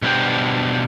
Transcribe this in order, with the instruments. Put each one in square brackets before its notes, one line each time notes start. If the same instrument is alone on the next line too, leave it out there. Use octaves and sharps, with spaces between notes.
[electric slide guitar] B2 G3 D4 C5 G5